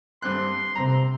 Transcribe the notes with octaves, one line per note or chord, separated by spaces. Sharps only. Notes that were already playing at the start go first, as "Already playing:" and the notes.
G2 C4 C6 F#6
C3 C4 A#5